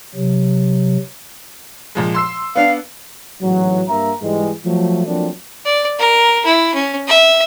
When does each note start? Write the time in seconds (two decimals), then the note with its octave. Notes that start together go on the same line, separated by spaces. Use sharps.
0.15 C3 F#3
1.95 A#2 F3 G#3
2.15 C6 E6 C7
2.55 B3 D4 F5
3.42 A1 G#2 E3 F#3
3.88 G2 A#3 E5 A#5
4.22 G#2 E3 G3 G#3
4.65 F3 F#3 A3
5.06 F3 F#3 A3 A#3 C4 D4
5.65 D5
5.99 A#4
6.45 E4
6.74 C#4
7.07 E5